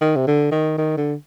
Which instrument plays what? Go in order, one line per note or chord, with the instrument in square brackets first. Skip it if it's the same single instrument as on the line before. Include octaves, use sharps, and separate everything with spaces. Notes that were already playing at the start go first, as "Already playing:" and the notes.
[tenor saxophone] D#3
C3
D3
D#3
D#3
D3